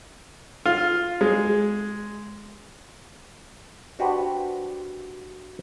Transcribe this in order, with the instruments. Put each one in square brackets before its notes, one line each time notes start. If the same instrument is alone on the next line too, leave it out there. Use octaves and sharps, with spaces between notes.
[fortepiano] F4
G#3
[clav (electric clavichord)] D4 F#4 G4 B4 C5